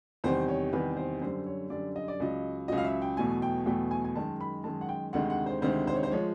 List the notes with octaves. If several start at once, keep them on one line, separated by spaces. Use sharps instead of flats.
E2 C3 D#3 G3 C5
C#5
E2 C3 D#3 G3 B4
C5
F#2 D3 G3 C5
C#5
F#2 D3 G3 D5
D#5
D5
C#2 C#3 F#3 D#5
C#2 C#3 F#3 D#5
F5
E5
G5
E2 B2 F#3 A3 G#5
G5
E2 B2 F#3 A3 G5
G#5
G#5
F#2 D#3 G#3 A5
B5
F#2 D#3 G#3 A5
F#5
G5
D2 C3 D#3 G#3 F#5
F#5
C5
D2 C3 D#3 G#3 C5
C5
C#5
C5
F3 G#3 C#5